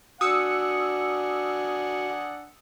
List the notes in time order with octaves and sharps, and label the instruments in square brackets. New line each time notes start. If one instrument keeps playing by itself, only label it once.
[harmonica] D4 F#5 G#5 [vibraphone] F#4 [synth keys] D#6 E6 C#7